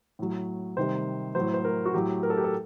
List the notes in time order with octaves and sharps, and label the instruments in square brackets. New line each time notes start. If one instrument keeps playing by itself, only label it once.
[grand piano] A2 F#3
C3 D#3 G3 C5
A2 F#3 C5
C5
A#4
F#4
A2 F#3 G4
A#4
A4
G4
A4